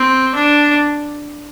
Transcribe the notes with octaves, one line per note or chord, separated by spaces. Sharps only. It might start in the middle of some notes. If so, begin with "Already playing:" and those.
Already playing: C4
D4